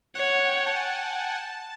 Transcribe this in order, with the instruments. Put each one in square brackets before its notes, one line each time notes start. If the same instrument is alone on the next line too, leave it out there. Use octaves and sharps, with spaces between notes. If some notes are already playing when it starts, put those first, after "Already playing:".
[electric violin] C#5 [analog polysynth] F#5
[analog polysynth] G5
A5
G#5
G#5
G#5
A5
A5